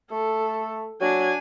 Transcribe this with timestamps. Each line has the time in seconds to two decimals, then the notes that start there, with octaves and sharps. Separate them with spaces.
0.11 A3 A4
1.01 F#3 D4 G#5